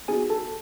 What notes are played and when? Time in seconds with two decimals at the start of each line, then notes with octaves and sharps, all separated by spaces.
0.08 B3 D#4 F#4 G#4 G#5
0.30 A4 A5